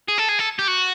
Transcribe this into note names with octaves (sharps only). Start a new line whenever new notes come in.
G#4
A4
G#4
A4
G4
F#4